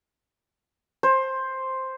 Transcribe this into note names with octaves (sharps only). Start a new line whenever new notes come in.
C5